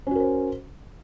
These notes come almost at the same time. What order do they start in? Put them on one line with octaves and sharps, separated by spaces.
C#4 F#4 A#4 C5